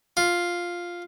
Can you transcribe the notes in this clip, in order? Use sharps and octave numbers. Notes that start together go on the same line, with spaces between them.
F4